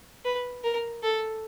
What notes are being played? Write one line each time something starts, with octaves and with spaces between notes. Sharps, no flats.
B4
A#4
A4